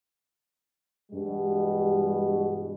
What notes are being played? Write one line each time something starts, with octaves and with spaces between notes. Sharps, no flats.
G2 B2 E3 G3 G#3